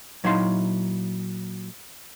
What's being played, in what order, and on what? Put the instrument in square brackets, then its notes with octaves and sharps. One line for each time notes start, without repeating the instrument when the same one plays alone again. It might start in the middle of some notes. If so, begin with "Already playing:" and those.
[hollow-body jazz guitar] A#2 F#3 D#4 E4 F5 C6